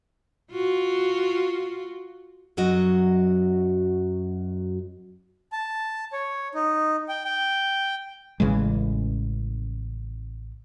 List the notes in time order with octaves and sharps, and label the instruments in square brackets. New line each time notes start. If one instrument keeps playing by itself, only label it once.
[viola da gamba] F4 F#4
[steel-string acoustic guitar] F#2 F#3 F#4 D#5
[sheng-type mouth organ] A5
C#5
D#4
G5
G5
[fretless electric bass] A1 C#3 E3 G#3